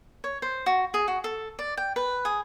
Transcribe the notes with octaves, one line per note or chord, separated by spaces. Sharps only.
C#5
C5
F#4
G#4
F#4
A4
D5
G5
B4
G#4